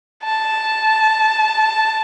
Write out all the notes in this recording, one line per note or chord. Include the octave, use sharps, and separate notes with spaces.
A5